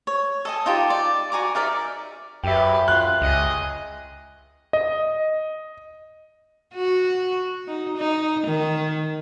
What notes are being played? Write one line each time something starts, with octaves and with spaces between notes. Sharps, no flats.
C#5
A4 D#5 G#5
D#4 F4 G4 A4
D5
F#4 G#5 A#5 D6
D#4 A#4 D5 E5
F#2 G4 B4 E5 G5
F4 F#6
C#2 G#4 D#5
D#5
F#4
D#4
D#4
D#3